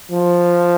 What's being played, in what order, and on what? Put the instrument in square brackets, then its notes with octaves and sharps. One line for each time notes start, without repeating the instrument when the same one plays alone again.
[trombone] F3